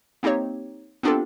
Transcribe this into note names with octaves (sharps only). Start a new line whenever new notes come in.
A#3 C4 D#4 G4 C#5
B3 C4 D4 F4 G4 A4